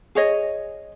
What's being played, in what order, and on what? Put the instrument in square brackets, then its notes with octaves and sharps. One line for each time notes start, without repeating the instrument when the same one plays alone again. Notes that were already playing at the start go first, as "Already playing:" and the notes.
[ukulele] G#4 C#5 D#5